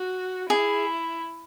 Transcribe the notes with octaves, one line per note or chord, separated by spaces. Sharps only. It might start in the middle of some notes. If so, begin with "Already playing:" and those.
Already playing: F#4
E4 G#4